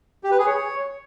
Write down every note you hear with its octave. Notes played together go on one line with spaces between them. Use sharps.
G4
B4
G#4
C#5